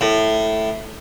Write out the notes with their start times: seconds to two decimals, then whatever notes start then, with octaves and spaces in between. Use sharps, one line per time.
0.01 A2